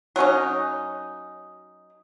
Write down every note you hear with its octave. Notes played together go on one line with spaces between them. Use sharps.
F#3 A#3 C#4 D#4